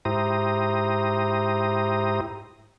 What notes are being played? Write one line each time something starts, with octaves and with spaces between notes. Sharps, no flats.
G#2 E4 G4 C5 A#5 D#6